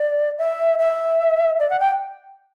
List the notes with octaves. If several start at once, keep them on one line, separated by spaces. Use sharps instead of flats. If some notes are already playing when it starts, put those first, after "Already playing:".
Already playing: D5
E5
E5
D5
F#5
G5